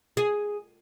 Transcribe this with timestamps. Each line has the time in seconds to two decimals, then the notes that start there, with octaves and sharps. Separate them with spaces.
0.17 G#4